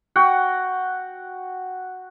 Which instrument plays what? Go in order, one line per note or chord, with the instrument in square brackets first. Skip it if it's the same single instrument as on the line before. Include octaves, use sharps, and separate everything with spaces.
[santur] F#4 F#5 G5